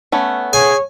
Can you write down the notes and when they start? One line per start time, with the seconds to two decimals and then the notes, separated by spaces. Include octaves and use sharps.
0.12 A3 B3 C#4
0.53 G#4 C#5 G#5